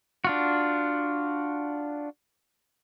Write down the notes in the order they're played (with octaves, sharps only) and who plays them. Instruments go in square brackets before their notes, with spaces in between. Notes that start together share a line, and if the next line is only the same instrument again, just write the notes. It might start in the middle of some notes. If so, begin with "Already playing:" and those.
[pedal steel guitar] D4 F4 F#4